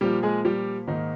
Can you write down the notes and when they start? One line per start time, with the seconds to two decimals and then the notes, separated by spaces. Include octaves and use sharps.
0.01 A#2 F3 G3 A#3 G4
0.23 G#3 G#4
0.45 G3 G4
0.87 G#2 D#3 A#3 D#4